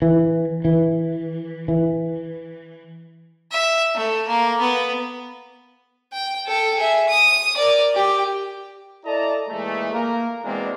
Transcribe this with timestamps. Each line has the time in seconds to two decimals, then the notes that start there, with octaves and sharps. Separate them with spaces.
0.02 E3
0.65 E3
1.68 E3
3.51 E5
3.95 A3
4.27 A#3
4.60 B3
6.13 G5
6.47 A4 G5
6.77 G#4 E5
7.09 D#6
7.57 A#4 D5
7.95 G4
9.05 E4 A4 D5 D#5 A5 A#5
9.48 A#2 E3 G#3 A3
9.93 A#3 A#4
10.44 E2 B2 G#3 A#3 C4 D4